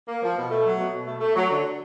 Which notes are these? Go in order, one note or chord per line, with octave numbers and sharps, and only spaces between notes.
A#3
F3
B2
A3
F#3
B2
B2
A3
A3
F#3
D3